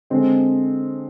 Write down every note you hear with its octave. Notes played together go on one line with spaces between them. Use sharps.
D3 G#3 C4